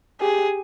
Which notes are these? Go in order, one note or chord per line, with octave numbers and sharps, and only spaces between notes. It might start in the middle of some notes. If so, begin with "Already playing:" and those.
G4 G#4